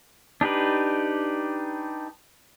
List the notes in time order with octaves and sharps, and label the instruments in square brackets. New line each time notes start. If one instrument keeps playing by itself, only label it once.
[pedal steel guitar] D4 D#4 G4 B4